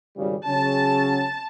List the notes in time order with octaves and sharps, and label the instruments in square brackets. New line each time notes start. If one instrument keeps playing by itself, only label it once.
[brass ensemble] G#1 C#3 G3
[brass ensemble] C#3 F#3 C#4 [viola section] A5